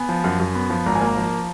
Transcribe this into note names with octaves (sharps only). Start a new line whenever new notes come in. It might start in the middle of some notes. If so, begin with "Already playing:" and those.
Already playing: B3 G#5
F3
F#2
F#2
B3
F3
G#1 A#5
G#5
A#3
A#5
F3